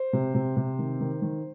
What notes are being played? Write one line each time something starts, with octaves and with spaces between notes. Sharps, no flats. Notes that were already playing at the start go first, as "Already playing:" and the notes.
Already playing: C5
C3
C3
C3
D#3
D#3
D#3